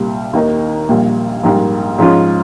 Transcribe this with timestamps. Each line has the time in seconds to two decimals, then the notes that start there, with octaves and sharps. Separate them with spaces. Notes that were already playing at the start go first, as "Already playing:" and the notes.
Already playing: C2 A#2 G3
0.33 D#2 D#3 A#3 D#4 A#4
0.89 A#1 A#2 G3
1.43 A#1 G#2 G3 A#3
1.98 G#2 F3 G#3 C#4 F4